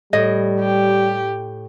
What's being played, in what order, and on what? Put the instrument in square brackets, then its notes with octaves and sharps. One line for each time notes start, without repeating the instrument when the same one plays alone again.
[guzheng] A2 [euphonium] G3 [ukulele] D#5
[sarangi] G4